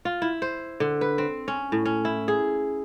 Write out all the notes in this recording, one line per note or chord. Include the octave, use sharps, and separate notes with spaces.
F4
E4
C5
D3
B4
C4
C#4
A2
C#4
E4
G#4